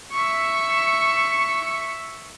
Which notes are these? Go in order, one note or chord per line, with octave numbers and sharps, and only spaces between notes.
E5 C#6